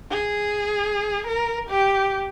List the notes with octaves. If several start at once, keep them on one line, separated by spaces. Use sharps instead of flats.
G#4
A#4
G4